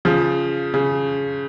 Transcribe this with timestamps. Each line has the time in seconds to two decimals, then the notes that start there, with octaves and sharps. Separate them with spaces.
0.05 C#3 F3
0.74 C#3